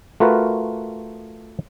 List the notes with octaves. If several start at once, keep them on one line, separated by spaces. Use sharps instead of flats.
A3 F4 F#4 A#4 B4